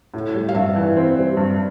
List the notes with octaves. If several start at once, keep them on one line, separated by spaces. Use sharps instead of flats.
A2
G3
F5
G2 E5
E3
C4
G3
G2